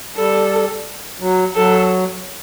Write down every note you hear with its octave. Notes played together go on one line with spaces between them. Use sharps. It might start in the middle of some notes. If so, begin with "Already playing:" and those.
G3 A4
F#3
F#3 A4